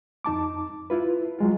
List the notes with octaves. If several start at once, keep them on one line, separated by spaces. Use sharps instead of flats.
F2 D#4 A5 D6
E4 F4 B4
F#3 G#3 F4